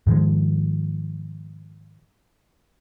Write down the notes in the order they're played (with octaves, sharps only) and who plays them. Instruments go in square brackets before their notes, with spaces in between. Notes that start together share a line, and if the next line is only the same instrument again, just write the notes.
[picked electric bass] G#2 D#3 F3 G#3